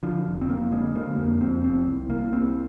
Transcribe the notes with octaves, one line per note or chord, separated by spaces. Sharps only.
D3 F3
F1
C4
F1 A#3
D3 G#3
D3 A#3
F2 A#3
F2 C4
F1 C4
C2
C2 A#3
C2 C4